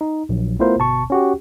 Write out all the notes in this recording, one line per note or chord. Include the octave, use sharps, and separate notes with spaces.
D#4
A#1 F#3
A3 B3 E4 F4 A#4 C5
G1 B2 A5 C#6
C#4 F#4 G4